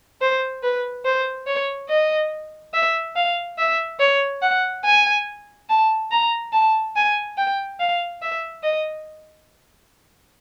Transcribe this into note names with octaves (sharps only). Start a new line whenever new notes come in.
C5
B4
C5
C#5
D#5
E5
F5
E5
C#5
F#5
G#5
A5
A#5
A5
G#5
G5
F5
E5
D#5